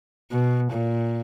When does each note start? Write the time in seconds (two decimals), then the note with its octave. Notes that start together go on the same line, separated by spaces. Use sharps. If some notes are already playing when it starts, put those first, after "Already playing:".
0.32 B2
0.72 A#2